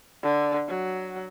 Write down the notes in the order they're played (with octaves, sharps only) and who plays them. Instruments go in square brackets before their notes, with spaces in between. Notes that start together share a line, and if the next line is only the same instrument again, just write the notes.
[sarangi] D3
F#3